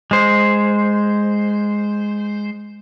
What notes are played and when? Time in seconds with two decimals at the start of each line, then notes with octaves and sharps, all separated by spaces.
0.11 G#3 C5